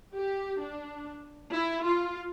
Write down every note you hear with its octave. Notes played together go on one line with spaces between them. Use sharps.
G4
D4
E4
F4